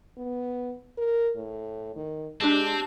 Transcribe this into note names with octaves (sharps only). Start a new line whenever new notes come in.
B3
A#4
A2
D#3
G#3 C4 D4 G4 A5